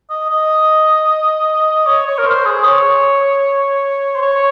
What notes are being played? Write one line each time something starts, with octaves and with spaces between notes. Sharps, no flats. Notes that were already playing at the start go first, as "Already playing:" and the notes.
D#5
D#5
C#5
C#5
A#4
C5
G#4
C#5
C5
C#5